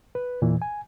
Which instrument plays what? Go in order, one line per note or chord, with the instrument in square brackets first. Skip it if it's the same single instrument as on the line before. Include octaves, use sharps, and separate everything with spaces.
[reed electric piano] B4
E2 A#2 E3
G#5